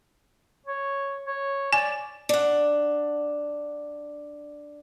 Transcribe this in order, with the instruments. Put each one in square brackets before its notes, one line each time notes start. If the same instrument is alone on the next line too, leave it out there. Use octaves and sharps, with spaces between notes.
[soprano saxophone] C#5
C#5
[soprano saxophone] D5 [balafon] G#5
[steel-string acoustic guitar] D4 F#5